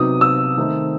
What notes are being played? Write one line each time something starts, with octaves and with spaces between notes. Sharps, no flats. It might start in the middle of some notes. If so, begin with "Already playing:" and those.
Already playing: C3 F#3 B3 D#4 D#6
E6
D#3 A3 C4 D#4